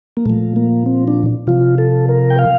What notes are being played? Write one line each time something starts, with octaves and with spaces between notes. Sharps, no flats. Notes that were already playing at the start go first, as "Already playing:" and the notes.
A#3
A#2 F3 A3
A#3
C4
D4
C3 F3 F4
A4
A#4
G5
F5